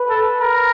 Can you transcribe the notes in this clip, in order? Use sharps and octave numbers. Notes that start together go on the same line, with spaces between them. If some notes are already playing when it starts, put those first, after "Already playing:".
Already playing: B4
A4
A#4